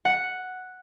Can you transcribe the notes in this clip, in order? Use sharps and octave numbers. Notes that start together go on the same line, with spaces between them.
F#5